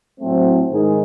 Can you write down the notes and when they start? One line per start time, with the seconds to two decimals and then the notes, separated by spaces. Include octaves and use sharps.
0.20 A2 F#3 A3 C4
0.69 G#2 D#3 G#3 D#4 G#4